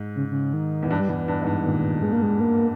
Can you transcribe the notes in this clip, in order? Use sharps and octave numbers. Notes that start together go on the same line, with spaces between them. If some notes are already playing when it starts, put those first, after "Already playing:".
Already playing: G#2
C#3
C#3
D#3
E2
G2 E3
G3
E2 E3
G2
G#2
G2
A#2 D#3
G#3
A#3
G#3
A#3